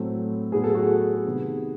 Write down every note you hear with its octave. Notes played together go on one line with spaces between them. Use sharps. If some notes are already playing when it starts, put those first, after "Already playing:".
Already playing: A2 F#3 A3 C4
A2 F#3 B3 G#4
A4
F#4 G#4
C3 D#3 G#3 B3